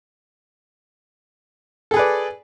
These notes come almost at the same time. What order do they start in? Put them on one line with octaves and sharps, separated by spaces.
A4 G#4 B4 D5